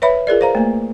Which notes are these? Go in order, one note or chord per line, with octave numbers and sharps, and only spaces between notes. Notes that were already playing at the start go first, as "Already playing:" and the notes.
B4 C#5 E5 B5
F4 G#4 A#4 D5
C5 F5 A#5
A3 A#3